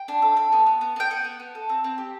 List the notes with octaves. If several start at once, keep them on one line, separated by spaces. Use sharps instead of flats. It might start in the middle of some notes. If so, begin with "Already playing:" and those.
Already playing: G5
D4
A4
A4
B3
B3
B3
B3 G5
B3 F#5
B3
B3
A4
C4
C4
G4